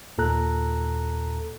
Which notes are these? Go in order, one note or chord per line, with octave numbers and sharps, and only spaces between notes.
D#2 A#2 A4 A#5 F#6